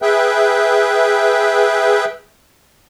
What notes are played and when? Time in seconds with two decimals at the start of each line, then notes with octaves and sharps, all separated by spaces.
0.02 G#4 B4 E5 G5